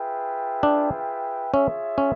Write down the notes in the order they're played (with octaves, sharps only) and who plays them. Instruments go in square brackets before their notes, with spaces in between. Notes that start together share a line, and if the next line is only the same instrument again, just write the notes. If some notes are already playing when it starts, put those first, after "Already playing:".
Already playing: [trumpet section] F4 G#4 B4 E5 G5
[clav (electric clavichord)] D4
[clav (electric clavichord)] C#4 [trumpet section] F4 G#4 C#5 E5
[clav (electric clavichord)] C#4